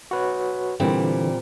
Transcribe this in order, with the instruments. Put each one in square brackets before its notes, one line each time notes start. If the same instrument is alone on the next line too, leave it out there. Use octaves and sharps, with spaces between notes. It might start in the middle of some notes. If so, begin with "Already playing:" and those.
[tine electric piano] F#4 B4 C#5
[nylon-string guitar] A#2 G3 C4 [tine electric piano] D3 E3